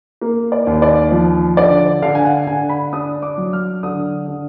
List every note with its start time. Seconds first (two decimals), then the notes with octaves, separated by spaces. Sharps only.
0.21 A#3
0.52 D5
0.67 D#2
0.82 D5
1.12 F3
1.57 D3 D5
2.02 D3 F5
2.15 G#5
2.25 F#5
2.47 D3 G#5
2.69 B5
2.93 D4 D#6
3.22 D6
3.38 F#3
3.53 F6
3.83 D3 D#6
4.28 D3